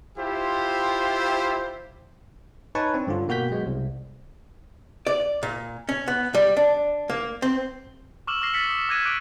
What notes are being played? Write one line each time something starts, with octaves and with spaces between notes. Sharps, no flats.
E4 F4 G4 C5
D#4 B4 C#5 G#5 A5 C#6
C4 D4
G2 D3 C#4 F4
B2 A#3 F#4 G5 G6 B6
F#3 G#3 B3
C2
D5
A#2
C#4
B3
G3
D4
A#3
C4
C#6 D6 E6 F6 E7 F#7
D6 E6 F6 A#6 C7
E6 A6 B6 C#7 F#7
D#6
D6 F#6 G#6 A#6 D#7
D6 F#6 D7 D#7